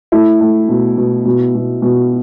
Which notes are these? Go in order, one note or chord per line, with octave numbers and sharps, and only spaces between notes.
A3 E4
A3
B2
B2
B2
B2
B2